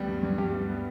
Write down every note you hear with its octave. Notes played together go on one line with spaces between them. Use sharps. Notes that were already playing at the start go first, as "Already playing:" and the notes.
Already playing: D2 G3 B3
G2
G2
G2 G4
G3
B3